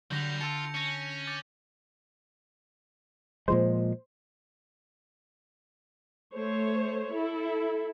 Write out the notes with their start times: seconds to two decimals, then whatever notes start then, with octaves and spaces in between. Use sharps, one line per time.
0.11 D3 F#3 G3 G6 A#6 F7
0.41 F4 A5 E6 C#7
0.75 C#4 A#6 C#7
1.27 D6 G6 A6
3.48 A#2 F3 G#3 C5
6.34 A3 C5 C#5
7.12 E4 A4